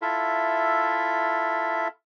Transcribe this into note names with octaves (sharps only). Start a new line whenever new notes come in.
E4 F4 A4 E5